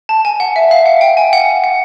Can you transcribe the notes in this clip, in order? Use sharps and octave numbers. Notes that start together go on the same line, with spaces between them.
A5
G#5
F#5
E5
F5
F#5
G5
G#5
F#5
F#5